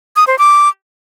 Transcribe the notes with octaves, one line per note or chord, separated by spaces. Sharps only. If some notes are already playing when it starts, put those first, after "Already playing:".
D#6
C5
D6